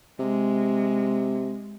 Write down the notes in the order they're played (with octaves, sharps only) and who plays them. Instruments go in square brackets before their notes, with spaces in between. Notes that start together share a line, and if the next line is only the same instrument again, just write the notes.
[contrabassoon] C3 [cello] G#3